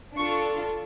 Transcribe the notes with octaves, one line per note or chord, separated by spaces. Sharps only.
D4 F4 A4 C#6